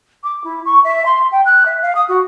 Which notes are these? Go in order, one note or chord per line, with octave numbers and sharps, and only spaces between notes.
D6
E4
C#6
E5
C6
G5
F#6
E5
F5
D#6
F#4